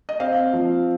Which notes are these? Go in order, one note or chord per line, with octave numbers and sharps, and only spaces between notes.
D#5
C4 F5
F3